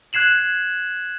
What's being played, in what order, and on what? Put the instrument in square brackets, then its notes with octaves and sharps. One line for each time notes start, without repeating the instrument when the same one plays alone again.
[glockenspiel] F#6 G#6 C7 E7 F#7